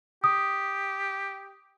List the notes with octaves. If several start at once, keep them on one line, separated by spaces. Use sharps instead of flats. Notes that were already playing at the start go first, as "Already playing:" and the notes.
G4 D#6